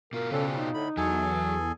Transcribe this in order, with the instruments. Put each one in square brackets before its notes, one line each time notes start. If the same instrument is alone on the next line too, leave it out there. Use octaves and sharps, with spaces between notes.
[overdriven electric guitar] B2 F4 [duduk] A#4
[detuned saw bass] C#3 [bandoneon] C4 D4 [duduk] A4
[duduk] D#4
[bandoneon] A2 B5 [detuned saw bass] D3
[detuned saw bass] E2 [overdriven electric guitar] F#3 [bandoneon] G#4 A4 G#5